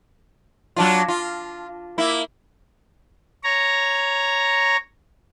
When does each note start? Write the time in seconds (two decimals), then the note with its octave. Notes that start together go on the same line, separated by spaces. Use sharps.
0.76 F#3 D4 F4
1.08 F4
1.98 A#3 E4
3.44 C#5 A#5